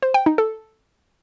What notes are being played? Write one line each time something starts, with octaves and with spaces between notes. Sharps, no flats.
C5
G5
D#4
A4